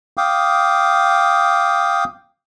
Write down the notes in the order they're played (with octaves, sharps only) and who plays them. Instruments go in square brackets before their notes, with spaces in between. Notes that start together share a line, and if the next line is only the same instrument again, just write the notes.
[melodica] F5 G5 D6 D#6